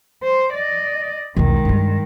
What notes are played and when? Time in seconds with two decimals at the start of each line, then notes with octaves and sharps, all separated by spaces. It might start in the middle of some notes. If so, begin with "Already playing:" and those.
0.23 C5
0.53 D5 D#5
1.37 B1 E2 D#3 G#3
1.65 G2 G3